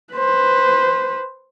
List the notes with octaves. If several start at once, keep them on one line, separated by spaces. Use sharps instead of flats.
B4 C5